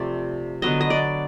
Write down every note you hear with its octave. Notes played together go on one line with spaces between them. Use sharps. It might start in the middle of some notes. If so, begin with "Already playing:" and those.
Already playing: C3 F3 A3 D5
D3 F#3 B3 D#5
D#5
D5